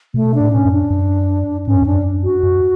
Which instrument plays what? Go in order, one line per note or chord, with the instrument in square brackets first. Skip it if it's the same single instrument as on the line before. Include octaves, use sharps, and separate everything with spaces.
[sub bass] B2 [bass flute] A3
[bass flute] D4
[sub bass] A2
[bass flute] C#4
[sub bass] F#2
[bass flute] D4
[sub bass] F#2
[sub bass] G#2 [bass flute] C#4
[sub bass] F#2
F2
[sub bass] F#2 [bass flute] D4
[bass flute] F#4
[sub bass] F#2